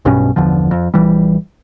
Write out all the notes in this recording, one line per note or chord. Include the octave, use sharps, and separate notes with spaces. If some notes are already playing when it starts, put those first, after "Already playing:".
B1 G2 B2 C#4
G1 E2 D3 F3
F2
A#1 E3 G3